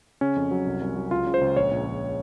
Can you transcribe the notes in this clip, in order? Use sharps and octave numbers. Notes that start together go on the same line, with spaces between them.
C#3 C#4
F2
F#3
C2
C2
F#3
C#2 F4
C#3
C5
C#2
A#1 C#5
A#1
A#1